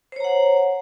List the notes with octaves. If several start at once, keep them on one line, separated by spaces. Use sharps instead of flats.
C5 C#5 F#5 A#5